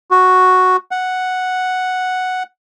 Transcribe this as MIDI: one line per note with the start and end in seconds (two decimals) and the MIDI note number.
0.11 0.77 66
0.91 2.43 78